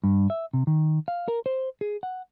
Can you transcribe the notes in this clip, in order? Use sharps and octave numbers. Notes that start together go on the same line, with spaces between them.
G2
E5
C3
D#3
F5
A#4
C5
G#4
F#5